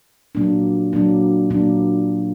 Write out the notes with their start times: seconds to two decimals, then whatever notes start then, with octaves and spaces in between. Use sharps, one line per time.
0.35 A#2 F#3 A#3 D4
0.93 A#2 F#3 A#3 D4
1.50 A#2 F#3 A#3 D4